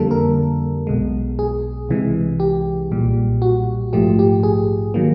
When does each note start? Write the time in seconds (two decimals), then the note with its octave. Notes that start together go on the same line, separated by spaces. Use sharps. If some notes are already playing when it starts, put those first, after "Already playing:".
Already playing: F2 D3 G3 A#3 A4
0.11 A#4
0.87 B1 B2 G#3
1.39 G#4
1.89 C2 C3 E3 G#3
2.40 G4
2.92 B1 A#2 G3
3.42 F#4
3.93 A#1 G#2 F3 A3 G4
4.19 G4
4.43 G#4
4.94 D#3 F#3 A#3